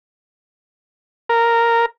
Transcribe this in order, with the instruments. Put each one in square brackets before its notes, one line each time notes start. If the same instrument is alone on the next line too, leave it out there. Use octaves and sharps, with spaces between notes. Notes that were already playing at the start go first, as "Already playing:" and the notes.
[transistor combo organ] A#4